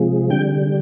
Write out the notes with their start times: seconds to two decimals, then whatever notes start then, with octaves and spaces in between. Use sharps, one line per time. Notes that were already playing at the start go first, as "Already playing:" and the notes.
Already playing: C3 F3 G#3
0.30 D3 G3 G5